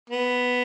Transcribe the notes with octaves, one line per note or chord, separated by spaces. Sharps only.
B3